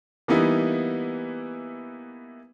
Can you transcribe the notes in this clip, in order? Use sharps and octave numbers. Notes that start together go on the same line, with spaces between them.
E3 G3 A#3 B3 D#4 E4